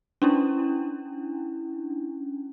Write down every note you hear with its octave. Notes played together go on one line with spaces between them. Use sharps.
C#4 D4 E4